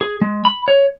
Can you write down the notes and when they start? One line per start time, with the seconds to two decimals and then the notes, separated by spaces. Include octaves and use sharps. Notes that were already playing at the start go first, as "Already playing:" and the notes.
0.01 G#4
0.21 G#3
0.45 B5
0.68 C#5